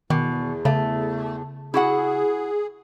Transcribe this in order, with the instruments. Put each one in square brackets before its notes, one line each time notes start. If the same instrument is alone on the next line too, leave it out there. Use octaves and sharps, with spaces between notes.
[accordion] E2 [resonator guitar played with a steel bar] B2 [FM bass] D#3
[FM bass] C#3 [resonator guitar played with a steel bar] A3
[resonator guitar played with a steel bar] E4 F#4 F#5 [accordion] G#4